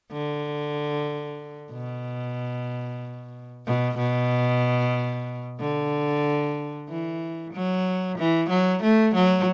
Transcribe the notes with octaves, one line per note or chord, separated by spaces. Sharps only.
D3
B2
B2
B2
D3
E3
F#3
E3
F#3
A3
F#3